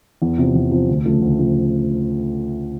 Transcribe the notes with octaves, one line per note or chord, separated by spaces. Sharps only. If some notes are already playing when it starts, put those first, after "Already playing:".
E2
C3 F3
E2
C3 F3
D2
C#3 F3 A3
D2
C#3 F3 A3